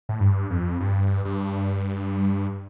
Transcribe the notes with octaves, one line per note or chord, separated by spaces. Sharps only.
A2
G2
F2
G2
G2